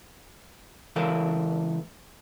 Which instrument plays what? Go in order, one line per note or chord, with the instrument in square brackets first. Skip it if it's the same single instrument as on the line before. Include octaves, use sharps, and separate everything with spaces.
[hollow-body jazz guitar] C#2 E3 A4 A#4 F5